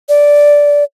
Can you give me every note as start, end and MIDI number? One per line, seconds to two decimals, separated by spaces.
0.09 0.84 74